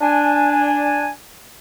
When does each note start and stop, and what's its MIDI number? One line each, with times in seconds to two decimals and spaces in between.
0.01 1.10 62
0.01 1.10 80